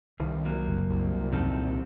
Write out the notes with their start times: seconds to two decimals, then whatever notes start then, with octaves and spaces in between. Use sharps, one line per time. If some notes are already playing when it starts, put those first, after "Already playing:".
0.20 C2 G2 D#3
0.45 F#3 A#3
0.68 F#1
0.90 C2
1.32 E1 F#2 D#3 C4 A4
1.49 A#2